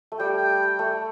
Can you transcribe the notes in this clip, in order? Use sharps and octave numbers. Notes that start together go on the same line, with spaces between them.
A3
G3 G5
G5
A3